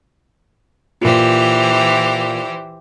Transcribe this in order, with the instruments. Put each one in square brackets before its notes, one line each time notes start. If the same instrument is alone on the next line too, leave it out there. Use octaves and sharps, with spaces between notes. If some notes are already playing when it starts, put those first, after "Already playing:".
[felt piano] A#2 F4 [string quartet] E3 G4 C5